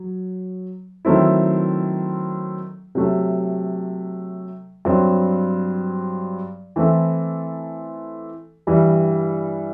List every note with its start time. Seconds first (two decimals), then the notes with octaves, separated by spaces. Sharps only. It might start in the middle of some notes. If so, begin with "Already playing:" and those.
Already playing: F#3
1.05 D#3 F#3 A3 C4 E4
2.95 C3 F#3 A3
4.85 G2 F#3 C4
6.76 E3 A3 C4 E4 A4
8.67 G2 E3 G3